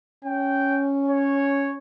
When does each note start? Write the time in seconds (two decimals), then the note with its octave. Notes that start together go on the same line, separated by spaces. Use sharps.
0.25 C#4 G5
1.08 C#5